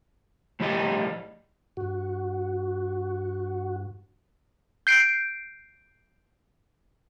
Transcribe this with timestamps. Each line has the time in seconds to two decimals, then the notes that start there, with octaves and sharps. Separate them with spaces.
0.60 A2 F3 G3 G4 D#5
1.77 G2 F#4
4.87 G6 C7 D7